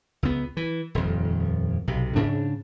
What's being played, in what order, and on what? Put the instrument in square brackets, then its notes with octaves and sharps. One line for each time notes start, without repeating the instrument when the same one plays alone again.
[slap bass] C#2 B3
E3
D#1 F2
B1 C3
G#2 C#3 D4